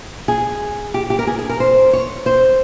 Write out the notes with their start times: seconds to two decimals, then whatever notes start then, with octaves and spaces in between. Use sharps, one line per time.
0.28 G#4
0.94 G4
1.10 G4
1.19 A#4
1.27 G#4
1.38 G#4
1.49 A#4
1.60 C5
1.93 C#5
2.26 C5